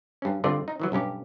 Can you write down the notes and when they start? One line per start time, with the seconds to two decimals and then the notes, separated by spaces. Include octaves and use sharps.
0.22 G2 C#4
0.44 G2 D3 C4 F4 D5
0.68 D#4
0.80 D#3 E3 F#3
0.92 B1 G2 C#4 G4